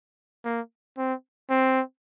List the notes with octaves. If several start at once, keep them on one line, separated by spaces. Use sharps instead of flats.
A#3
C4
C4